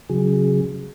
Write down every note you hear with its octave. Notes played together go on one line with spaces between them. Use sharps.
C#3 F#3 G#4